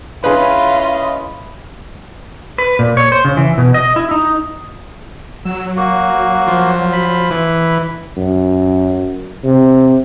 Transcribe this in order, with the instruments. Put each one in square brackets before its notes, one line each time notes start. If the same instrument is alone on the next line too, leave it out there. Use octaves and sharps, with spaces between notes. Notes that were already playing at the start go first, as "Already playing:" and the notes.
[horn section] C#4 E4 D#5 [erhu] F4 [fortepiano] G#4 B4 [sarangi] B5
[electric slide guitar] B4
A#2
C#5
C5
C#3
E3
B2
D#5
E4
D#4
[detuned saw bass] F#3 [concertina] E6
[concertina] A#3 F#4
[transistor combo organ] F3
[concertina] B5
[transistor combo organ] E3
[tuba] F#2
C3